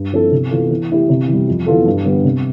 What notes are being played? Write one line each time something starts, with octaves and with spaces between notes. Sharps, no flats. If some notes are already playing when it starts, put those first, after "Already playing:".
Already playing: G2
F3 C4 E4 A4
C3
E3 B3 F4 A4
E3
A3 E4 G4
C3
E3 G3
F2
E3 B3 F4 A4
G2
D3 G3 B3
C3